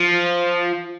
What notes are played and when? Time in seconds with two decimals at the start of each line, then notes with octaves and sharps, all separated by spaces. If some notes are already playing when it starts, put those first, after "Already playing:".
Already playing: F3